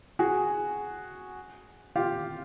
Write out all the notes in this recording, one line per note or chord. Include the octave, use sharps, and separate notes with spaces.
F#4 G#4
F4 G4